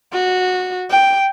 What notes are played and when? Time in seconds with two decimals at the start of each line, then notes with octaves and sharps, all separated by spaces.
0.13 F#4
0.90 G5